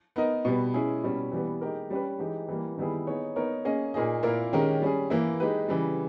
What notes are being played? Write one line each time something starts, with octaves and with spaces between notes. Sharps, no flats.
B3 D#4 A#4 D#5
B2 G3 B3
G#3 C#4 E4 G#4
B2 G3 C#4
E3 G3 B3
G#3 D#4 G4 A#4
G3 C#4 G4 B4
E3 G#3 D#4 G4
E3 G3 A#3
D#3 G3 B3 E4 G#4
B3 D#4 G#4 C#5
B3 D#4 A#4 C#5
A#3 C#4 G#4 D#5
A#2 A#3 D#4 G#4 D#5
A#2 A#3 E4 A#4
D#3 G#3 C#4 G4 A#4
G3 C#4 G#4
E3 A#3 E4
G#3 D#4 G4 B4
C#3 E3 G3